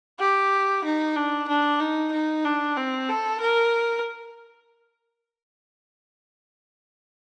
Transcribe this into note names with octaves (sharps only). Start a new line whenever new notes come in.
G4
D#4
D4
D4
D#4
D#4
D4
C4
A4
A#4